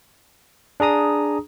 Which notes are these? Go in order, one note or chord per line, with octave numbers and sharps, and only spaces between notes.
D4 G#4 A#5 D#6